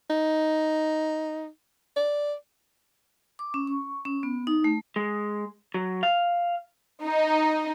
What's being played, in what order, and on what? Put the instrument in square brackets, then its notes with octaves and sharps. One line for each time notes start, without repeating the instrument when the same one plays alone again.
[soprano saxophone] D#4
D5
[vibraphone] D6
C#4
C#6
C#4
B3
D#4
A3
[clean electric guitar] G#3
F#3
F5
[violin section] D#4